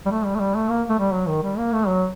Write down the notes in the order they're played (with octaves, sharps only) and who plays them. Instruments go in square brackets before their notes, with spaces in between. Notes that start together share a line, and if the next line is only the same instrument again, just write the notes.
[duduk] G3
A3
G3
A3
G3
A3
A#3
A3
G3
F#3
D#3
G3
A#3
A3
F#3